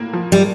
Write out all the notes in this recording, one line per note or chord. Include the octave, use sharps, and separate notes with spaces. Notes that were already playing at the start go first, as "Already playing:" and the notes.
Already playing: A2 A#3
F3
G3